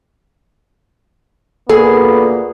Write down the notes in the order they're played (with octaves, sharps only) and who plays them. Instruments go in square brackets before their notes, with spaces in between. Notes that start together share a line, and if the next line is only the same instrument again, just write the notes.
[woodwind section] D2 A#2 A#3 [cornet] B3 [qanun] G#4 [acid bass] A4